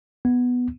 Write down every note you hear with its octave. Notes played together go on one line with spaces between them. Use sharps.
B3